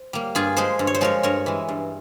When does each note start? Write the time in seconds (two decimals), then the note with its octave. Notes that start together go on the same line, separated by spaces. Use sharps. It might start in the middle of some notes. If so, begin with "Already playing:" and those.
Already playing: C5
0.13 G3 A#3
0.35 G2 F4 G#4
0.56 F3 G#3 G#4 C5
0.79 G2
0.87 C#5
0.95 C5
1.01 F3 G#3 A#4 C#5
1.23 G2 A#4 C#5
1.46 E3 G#3
1.69 G2